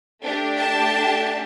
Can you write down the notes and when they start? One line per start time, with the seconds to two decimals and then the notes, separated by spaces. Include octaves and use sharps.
0.22 A3 D4 G4
0.58 A5